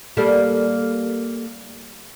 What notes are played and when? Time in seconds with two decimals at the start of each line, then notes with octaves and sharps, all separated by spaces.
0.17 G3 A#3 A4